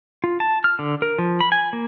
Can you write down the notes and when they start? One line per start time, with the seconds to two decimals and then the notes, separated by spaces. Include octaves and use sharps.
0.24 F4
0.40 A5
0.64 F6
0.79 D3
1.02 A#4
1.19 F3
1.40 B5
1.52 G#5
1.73 A#3